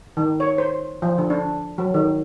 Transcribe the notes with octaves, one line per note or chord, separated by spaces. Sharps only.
D#3
C#5
C5
F3
D3
D4
F#3
D#3